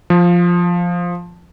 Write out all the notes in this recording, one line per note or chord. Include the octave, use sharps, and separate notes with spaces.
F3